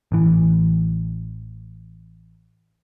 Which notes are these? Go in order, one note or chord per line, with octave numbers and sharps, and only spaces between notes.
A1 E3